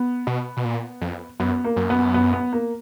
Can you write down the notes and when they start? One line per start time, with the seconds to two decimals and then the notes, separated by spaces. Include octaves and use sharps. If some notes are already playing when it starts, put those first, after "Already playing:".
Already playing: B3
0.27 B2
0.57 B2
0.65 A#2
1.01 F2
1.40 F#2 B3
1.64 A#3
1.76 F#2
1.90 B3
2.14 B3
2.33 B3
2.53 A#3